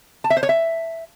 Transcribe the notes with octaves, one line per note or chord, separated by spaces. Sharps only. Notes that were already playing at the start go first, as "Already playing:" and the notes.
A5
E5
C5
C#5
E5